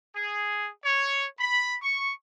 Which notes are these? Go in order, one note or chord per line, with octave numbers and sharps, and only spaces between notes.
G#4
C#5
B5
C#6